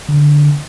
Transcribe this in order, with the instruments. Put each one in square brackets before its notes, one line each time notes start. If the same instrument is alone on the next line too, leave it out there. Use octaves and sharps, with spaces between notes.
[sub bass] D3